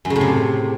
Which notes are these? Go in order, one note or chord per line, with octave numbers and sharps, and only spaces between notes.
F#2
C#3
A2
C3